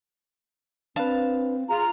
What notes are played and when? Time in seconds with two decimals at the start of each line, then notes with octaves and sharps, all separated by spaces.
0.96 C4 D4 B4 F5 A5
1.69 F4 G#4 A#5